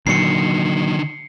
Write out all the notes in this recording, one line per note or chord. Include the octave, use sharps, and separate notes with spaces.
A#2 D3 D#3 F#3 C7 C#7